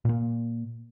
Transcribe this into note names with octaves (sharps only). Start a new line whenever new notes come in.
A#2 A#3